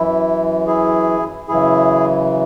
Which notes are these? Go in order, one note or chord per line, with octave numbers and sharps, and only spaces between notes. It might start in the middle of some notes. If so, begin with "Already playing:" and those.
Already playing: F#2 E3 E4
E4 G#4
F#2 C#3 E3 E4 G#4